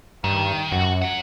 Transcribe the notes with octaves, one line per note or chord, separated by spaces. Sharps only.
G2 D#3
F#2 F#4
F#3 F#5